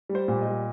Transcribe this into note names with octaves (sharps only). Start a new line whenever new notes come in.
G3
C5
A#2
D#5
G3